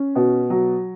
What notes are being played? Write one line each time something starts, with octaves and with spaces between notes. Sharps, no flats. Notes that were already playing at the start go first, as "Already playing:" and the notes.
Already playing: C#4
B2
F#3